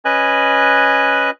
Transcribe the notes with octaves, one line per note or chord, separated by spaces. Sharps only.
C#4 B4 D#5 G#5 F#6